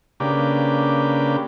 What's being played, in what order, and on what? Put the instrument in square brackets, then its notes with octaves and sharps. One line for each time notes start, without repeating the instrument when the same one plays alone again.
[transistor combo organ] C#3 A#3 D4 G4 B4